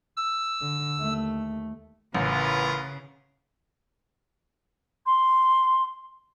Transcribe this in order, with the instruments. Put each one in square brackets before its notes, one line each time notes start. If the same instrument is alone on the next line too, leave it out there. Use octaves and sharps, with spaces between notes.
[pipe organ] E6
[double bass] D3
D#2 A3
[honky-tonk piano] A1 [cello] C#3 [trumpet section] F4 A#4 B4
[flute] C6